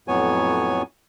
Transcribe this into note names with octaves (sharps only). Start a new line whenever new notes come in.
F2 A2 F#3 B3 C#5 G#5